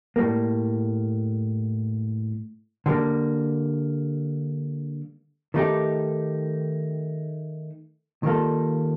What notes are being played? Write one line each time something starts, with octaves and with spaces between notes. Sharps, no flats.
A2 G3 A#3
D3 G3 A#3
D#3 A3 D#4 G4
D#3 G3 A#3 F4 A4